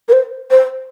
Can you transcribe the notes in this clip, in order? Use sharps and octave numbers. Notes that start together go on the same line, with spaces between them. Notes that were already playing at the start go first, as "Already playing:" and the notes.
A#4
C5
C5